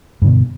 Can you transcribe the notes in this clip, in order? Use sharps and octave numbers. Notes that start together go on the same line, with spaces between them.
G2 B2 D3